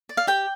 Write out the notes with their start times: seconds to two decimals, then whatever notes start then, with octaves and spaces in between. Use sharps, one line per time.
0.09 D5
0.17 F5
0.27 G4 G5